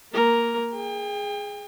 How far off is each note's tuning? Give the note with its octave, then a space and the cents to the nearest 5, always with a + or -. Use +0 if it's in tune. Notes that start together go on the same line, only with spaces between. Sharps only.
A#3 +0 A#4 +0
G#4 +0 G5 +35